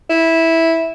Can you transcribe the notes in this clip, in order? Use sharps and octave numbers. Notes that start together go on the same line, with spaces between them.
E4